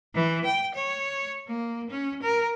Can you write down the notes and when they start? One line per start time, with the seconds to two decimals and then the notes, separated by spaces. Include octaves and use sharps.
0.15 E3
0.45 G5
0.75 C#5
1.48 A#3
1.90 C#4
2.22 A#4